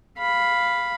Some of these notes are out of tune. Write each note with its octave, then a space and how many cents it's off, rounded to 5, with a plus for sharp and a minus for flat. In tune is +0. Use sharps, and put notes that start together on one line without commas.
F5 +0 B5 +0